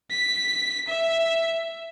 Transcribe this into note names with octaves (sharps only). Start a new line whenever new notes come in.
B6
E5